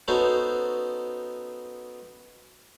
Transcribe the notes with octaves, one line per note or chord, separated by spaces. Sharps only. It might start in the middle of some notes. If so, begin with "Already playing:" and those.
B3 C#4 D#4 F#4 A4 C5